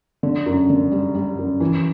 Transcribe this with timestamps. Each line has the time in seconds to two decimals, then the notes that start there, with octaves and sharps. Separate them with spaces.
0.23 D3
0.46 F#2
0.70 D3
0.91 G3
1.15 G3
1.38 F#2
1.60 E3